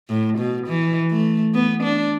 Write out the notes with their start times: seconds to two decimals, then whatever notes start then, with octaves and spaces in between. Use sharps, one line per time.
0.09 A2
0.38 B2
0.67 E3
1.11 A3
1.54 B3
1.83 D4